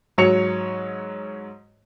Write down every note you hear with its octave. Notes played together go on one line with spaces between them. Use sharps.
G#2 F#3 C#5 C#7 F7